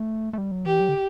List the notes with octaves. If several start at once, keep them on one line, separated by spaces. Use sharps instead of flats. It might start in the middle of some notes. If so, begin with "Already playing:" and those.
Already playing: A3
A3
G3
F#3
E3 G4
F#3
D3